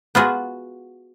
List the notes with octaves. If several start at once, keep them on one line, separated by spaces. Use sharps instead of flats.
B3 F4 F#4 G#4